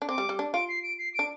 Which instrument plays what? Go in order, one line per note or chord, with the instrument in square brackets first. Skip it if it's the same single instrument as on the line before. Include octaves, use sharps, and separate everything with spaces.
[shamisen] D4
[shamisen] C4 [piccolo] D6
[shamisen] G3
G3
D4
[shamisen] F4 [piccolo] D7
[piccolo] C7
D7
C7
[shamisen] D4 [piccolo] D7